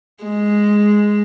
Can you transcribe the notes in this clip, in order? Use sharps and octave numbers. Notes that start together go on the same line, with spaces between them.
G#3